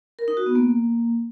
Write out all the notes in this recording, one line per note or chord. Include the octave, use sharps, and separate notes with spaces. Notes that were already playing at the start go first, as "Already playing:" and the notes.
A#4
D#4
F#4
B3
A#3